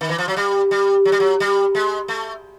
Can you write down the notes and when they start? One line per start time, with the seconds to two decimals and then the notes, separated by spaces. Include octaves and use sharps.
0.01 D#3
0.09 E3
0.18 F3
0.28 F#3
0.37 G3
0.71 G3
1.05 F#3
1.12 G3
1.20 F#3
1.40 G3
1.75 G#3
2.08 A3